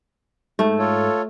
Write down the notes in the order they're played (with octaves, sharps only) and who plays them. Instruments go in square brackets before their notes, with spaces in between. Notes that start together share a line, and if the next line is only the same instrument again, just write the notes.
[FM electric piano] G#2 [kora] A3
[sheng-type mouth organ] F4 A4 C#5